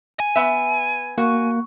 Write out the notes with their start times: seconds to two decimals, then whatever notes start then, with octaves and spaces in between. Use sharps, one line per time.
0.20 G#5
0.36 B3 E5
1.18 A#3 F#4